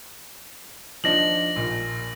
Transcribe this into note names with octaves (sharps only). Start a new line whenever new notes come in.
F3 D4 D#4 A#6 F#7
A#1 A#2